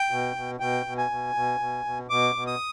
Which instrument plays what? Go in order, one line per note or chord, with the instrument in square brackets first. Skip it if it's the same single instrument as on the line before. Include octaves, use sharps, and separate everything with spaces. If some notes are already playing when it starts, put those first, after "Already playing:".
Already playing: [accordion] G5
B2
B2
B2 G5
B2
G#5
B2
B2
B2
B2
B2 D6
B2
D#6